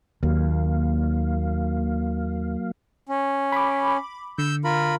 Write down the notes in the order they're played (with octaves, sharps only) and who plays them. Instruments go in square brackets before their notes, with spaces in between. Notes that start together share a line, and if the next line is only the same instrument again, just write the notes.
[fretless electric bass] D#2 [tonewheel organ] F#3 A#3 F5
[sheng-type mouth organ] C#4
[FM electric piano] B5 D6
[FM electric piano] D3 [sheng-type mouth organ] E6 G6
[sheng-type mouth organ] F4 A#4 B5